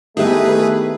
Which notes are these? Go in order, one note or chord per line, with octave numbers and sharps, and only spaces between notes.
D#3 A3 B3 E4 G4 G#4 B4 E5